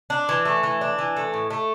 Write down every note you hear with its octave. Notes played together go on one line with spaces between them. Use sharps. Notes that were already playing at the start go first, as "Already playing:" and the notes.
D4
E3
A3
E3
D4
E3
A3
A2
A3